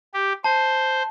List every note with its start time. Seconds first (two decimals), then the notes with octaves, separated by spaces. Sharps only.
0.14 G4
0.44 C5 A5